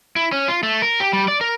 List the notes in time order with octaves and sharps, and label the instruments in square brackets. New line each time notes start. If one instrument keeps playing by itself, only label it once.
[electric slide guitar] E4
C#4
F4
A3
A#4
G4
G3
D5
A#4